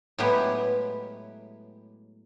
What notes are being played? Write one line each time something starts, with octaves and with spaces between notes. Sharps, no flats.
A2 F#3 G#3 B3 E4 G4